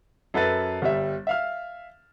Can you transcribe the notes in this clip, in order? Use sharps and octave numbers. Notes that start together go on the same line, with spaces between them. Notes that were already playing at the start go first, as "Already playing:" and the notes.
F#2 A4 B4 A6
G1 G3 E5
E5 F5 F6